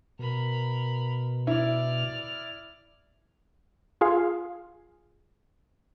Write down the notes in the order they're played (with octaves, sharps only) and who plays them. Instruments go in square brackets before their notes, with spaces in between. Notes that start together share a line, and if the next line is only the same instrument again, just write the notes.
[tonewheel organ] B2 [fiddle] A#4 B5
[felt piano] E4 [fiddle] D5 F6
[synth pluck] F4 G#4 F5